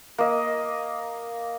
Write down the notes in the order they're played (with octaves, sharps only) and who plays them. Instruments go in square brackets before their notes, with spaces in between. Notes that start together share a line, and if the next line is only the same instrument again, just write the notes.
[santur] A#3 D#5